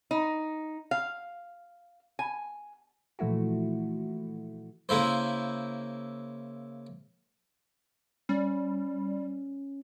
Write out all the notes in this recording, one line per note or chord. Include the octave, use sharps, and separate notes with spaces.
D#4
F5
G#5
A#2 E3 F3 A3 E4 F#4
C#3 A#3 E4 C5
G3 C#4